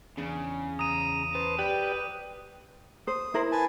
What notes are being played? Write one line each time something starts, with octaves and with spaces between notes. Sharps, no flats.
E2 C#3 D4 G#4
E2 A#5 D#6 D#7
B4 C5 A5
G4 B4 D5 G5
C5 D#6
E4 A#4 C5
B4 G#5 A5